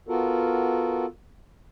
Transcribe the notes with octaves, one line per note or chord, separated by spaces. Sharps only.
B3 F4 F#4 A4 A#4